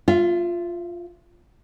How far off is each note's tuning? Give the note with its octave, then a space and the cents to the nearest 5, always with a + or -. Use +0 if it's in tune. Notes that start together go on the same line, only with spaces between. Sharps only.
F4 +0 E5 +35